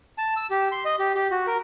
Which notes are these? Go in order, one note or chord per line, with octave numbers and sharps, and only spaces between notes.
A5
E6
G4
C6
D#5
G4
G4
F#4
A#4